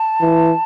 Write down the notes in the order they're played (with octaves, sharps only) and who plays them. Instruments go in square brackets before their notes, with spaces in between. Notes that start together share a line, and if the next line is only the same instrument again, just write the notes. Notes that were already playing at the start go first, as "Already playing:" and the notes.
Already playing: [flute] A5
[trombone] E3